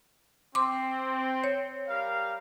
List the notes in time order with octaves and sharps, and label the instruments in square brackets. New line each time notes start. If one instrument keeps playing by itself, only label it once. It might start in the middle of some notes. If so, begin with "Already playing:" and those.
[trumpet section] C4 [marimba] C6 D6
[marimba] C#5
[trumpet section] G3 A#4 F5